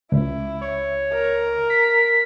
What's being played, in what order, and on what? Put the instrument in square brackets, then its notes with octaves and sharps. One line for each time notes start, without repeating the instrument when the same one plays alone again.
[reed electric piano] C#2 [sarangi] E4
[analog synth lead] C#5
[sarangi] A#4
[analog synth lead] B6